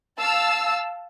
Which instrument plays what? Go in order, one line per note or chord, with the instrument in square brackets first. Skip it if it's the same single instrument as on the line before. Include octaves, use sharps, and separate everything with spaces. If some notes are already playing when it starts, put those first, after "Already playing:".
[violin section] F5 A5 E6